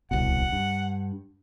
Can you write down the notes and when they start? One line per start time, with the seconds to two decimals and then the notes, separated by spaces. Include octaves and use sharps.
0.11 D1 C2 B2 F#5
0.52 G2